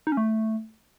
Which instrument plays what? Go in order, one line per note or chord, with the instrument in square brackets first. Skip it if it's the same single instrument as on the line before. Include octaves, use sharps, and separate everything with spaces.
[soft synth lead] D#4
C#4
A3